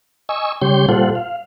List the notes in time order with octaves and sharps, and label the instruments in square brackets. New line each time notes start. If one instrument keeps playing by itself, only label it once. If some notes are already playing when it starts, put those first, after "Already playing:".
[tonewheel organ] D#5 G#5 C#6 E6
C#3 G3 G4 C#5 C6 G6
A#2 G3 F4 A4 C5 F#5
F5